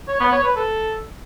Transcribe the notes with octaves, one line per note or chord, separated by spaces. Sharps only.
C#5
B3
C#5
B4
A4